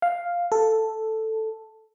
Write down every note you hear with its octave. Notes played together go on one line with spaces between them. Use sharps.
F5
A4